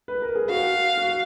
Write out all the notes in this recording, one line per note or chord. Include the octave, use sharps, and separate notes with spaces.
B4
A#4
G#4
F#4 F5
F#4